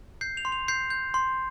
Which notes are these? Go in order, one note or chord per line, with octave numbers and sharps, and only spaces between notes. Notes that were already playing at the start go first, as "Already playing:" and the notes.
G6 C7
F7
C6
F7
G6 C7
G6
C6